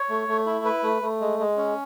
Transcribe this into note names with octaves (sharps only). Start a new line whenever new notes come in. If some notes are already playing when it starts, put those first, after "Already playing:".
Already playing: C#5
A3
A3
E4
B4
A3
A3
G#3
G#3
C#4